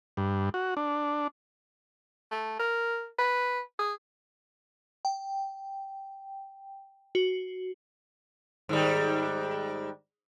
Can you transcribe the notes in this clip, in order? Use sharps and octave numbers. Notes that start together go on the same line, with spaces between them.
G2
F#4
D4
A3
A#4
B4
G#4
G5
F#4
G#2 D#3 G3